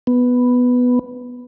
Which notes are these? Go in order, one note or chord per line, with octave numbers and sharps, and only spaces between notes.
B3